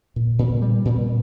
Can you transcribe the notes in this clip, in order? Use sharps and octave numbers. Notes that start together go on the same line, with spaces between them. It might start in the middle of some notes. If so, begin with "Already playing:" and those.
A#2
A#2
G3
A#2